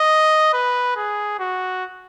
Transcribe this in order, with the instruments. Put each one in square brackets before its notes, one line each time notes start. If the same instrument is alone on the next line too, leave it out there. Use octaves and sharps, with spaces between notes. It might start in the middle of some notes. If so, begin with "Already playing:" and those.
Already playing: [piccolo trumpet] D#5
B4
G#4
F#4